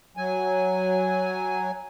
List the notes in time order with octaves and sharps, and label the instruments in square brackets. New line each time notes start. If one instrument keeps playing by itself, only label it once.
[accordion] F#3 [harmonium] G#5